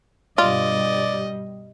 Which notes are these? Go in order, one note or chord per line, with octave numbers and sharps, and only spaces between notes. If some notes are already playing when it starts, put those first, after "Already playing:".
G2 B2 G3 F4 D5 D#5